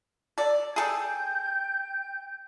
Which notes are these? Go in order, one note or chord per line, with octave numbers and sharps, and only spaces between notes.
A4 D5
G#4 A4 G5 G6